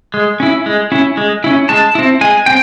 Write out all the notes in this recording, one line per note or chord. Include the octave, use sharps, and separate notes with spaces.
G#3
C#4 E4
G#3
C#4 E4
G#3
C#4 E4
G#3 A5
C4 E4
G#3 G#5
C4 G5